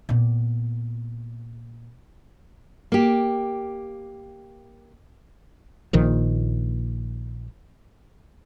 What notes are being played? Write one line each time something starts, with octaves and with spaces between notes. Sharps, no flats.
A#2 B3
A#3 G4
A#1 A#2 D#3 F3